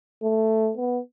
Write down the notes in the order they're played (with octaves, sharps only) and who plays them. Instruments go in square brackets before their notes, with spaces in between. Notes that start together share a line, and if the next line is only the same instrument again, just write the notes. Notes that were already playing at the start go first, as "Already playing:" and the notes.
[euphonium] A3
B3